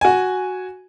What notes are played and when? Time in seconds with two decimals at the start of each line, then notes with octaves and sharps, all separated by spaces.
0.01 F#4 G#5